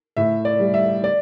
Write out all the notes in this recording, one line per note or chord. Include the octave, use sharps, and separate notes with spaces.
A2 E5
D5
G3
E5
D5